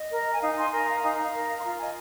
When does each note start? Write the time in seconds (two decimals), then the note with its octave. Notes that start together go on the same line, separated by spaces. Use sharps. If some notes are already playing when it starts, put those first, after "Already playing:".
Already playing: D#5
0.11 A#4
0.30 G#5
0.41 D#4 F5
0.57 G#5 C6
0.71 A#4 G#5 C6
0.87 F5 A#5
1.03 D#4 F5 A#5
1.34 A#4
1.59 C6
1.64 F4 F5 A#5
1.79 D#5 G#5